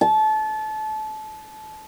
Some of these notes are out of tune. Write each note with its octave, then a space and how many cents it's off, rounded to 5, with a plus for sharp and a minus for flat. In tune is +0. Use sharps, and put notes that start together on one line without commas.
A5 -25